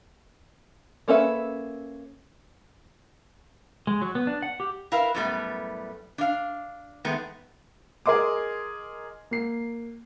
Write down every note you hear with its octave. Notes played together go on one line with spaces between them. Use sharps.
A#3 C#4 A4 B4 E5
G#3
F#3
B3
D4
F#5
G4
E4 A#4 B4 F5
F#2 A2 G3 A3 B3
D4 F5
D#3 G#3 A3 B3
G#4 A#4 D#5 C6 D6
A#3 C7